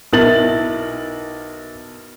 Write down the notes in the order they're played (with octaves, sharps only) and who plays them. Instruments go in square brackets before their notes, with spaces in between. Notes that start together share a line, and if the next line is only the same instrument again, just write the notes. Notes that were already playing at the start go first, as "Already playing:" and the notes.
[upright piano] B1 E4 A#4 A6 F#7